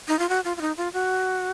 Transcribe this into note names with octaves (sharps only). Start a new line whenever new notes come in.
D#4
F4
F#4
F4
F4
D#4
F4
F#4